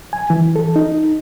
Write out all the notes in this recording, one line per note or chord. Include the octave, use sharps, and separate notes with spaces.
G#5
E3
A4
D#4